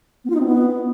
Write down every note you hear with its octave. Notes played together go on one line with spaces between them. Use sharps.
B3
F4
D#4
C4
B3